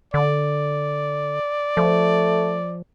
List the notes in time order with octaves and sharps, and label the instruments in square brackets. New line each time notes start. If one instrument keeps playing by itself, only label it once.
[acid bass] D3 [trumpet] D5
[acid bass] F3 [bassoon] A3